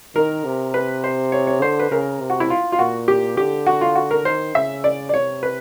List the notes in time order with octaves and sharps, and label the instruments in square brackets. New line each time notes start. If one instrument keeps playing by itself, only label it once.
[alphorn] D#3 [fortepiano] A#4
[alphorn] C3
[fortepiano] B4
C5
C#5
C#5
[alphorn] D3 [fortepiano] C5
[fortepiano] B4
[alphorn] C#3 [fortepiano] A#4
[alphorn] C3
[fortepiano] F#4
E4
F4
F4
[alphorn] A#2 [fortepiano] F#4
[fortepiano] G4
[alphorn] D3 [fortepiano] G4
[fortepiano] F#4
F4
F#4
A#4
[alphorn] D#3 [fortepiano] C5
[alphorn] C#3 [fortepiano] E5
[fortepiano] D5
D5
[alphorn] C3 [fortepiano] C#5
[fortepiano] B4